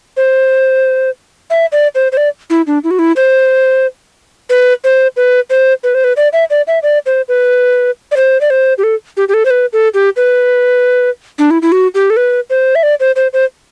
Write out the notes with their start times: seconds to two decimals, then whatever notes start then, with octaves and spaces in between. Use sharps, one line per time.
0.17 C5
1.50 E5
1.72 D5
1.95 C5
2.12 C5
2.17 D5
2.50 E4
2.67 D4
2.84 E4
2.91 F#4
2.99 E4
3.16 C5
4.50 B4
4.84 C5
5.17 B4
5.50 C5
5.84 B4
5.95 C5
6.04 B4
6.17 D5
6.33 E5
6.50 D5
6.67 E5
6.83 D5
7.06 C5
7.28 B4
8.11 D5
8.17 C5
8.41 D5
8.50 C5
8.78 G4
8.83 A4
9.17 G4
9.29 G4
9.34 A4
9.45 C5
9.50 B4
9.73 A4
9.94 G4
10.16 B4
11.39 D4
11.51 E4
11.62 E4
11.72 F#4
11.95 G4
12.10 A4
12.17 B4
12.50 C5
12.75 E5
12.83 D5
13.00 C5
13.16 C5
13.33 C5